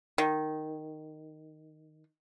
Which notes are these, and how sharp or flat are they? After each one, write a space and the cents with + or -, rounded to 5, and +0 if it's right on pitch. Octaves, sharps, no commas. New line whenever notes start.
D#3 -5